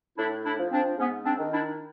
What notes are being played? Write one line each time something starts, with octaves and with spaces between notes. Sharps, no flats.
A2 D4 E4
D4 E4
F3
C4 D4
G#2 B3 C#4
C4 D4
D#3
D4 E4